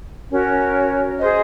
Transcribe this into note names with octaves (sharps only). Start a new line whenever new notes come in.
C#4 F#4 A#4 C#5
G#4 C5 D#5